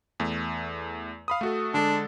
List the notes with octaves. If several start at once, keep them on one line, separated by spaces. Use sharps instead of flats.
E2 A3
F5 B5 D#6
A3 F#4 A4
D3 G#3 D4 A4